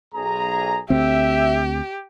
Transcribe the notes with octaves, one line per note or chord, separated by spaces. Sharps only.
B1 G#4 A#5
D2 C4 G4 E5